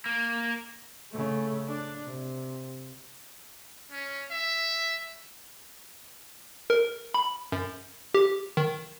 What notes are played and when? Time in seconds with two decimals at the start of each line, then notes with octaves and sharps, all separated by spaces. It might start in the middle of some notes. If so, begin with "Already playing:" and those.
0.06 A#3
1.11 C#3 A3
1.67 D4
2.05 C3
3.92 C#4
4.31 E5
6.70 A#4
7.14 B5
7.52 F#2
8.14 G4
8.57 D#3